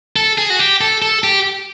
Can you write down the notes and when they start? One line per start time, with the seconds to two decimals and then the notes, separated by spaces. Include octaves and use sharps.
0.16 A4
0.38 G#4
0.50 F#4
0.59 G4
0.81 A4
1.02 A4
1.24 G4